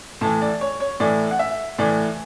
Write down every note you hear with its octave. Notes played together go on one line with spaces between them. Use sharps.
A2 E3 A5
D5
C#5
C#5
A2 E3 D5
F#5
E5
A2 E3 D5